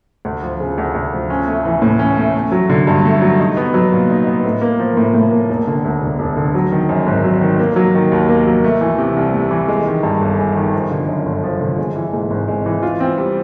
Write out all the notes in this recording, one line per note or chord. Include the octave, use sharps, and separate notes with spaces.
D2
F3
C#3
D2
D2
F3
C#4
A3
E3
A2
C#4
A3
A3
F#3
D3
G2
A3
F#3
D#4
B3
F#3
A#2
D#4
B3
A2
A#3
F3
A2
A2
A#3
E1
D3
D2
E1
E1
D3
F#3
D#3
F#2
G#1
F#3
D#3
A#3
F#3
D#3
D#2
A#3
F#3
A3
E3
C3
C2
A3
E3
G#3
D#3
G2
G1
G#3
D#3
F3
D3
F#2
G1
F3
D3
G#3
E3
G#2
G#1
G#3
E3
F4
C4
G3